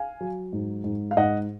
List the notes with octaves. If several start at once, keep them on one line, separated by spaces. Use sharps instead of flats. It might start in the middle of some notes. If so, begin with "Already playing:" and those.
Already playing: F5 G#5
F#3
G#2
G#2
F5
G#2 D#5 F#5